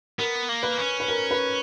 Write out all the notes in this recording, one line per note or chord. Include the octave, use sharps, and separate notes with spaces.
B3 A#4
A#3
B4
C#4
B4
A#4
B4